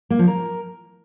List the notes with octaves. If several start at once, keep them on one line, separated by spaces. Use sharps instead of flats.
A#3
F3
A#4